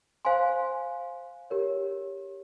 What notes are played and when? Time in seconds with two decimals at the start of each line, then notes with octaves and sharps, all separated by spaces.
0.25 C5 F5 G#5 C6
1.50 G4 A#4 C#5